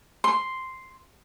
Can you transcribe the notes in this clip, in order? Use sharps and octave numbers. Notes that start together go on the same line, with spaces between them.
C6